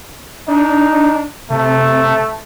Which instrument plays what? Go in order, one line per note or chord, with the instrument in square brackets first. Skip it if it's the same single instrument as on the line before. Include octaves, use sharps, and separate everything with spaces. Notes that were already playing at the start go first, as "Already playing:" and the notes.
[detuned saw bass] D4 [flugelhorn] D#4
[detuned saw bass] C3 [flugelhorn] A3